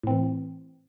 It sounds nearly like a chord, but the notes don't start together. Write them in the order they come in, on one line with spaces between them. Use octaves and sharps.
A2 C4 E3